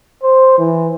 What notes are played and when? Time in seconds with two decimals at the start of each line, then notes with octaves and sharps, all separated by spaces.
0.23 C5
0.58 E3